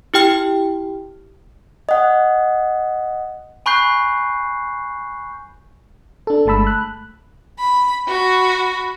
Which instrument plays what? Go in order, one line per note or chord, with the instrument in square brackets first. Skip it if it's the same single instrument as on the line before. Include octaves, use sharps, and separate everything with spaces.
[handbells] E4 G4 G5 F6
[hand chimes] D#5 F#5
[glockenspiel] G#5 B5 C#6 F#6 G6 C7
[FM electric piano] D4 A4
G1 G#3 A3 A5 B5 E6
B5 F#6
[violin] B5
F#4 B5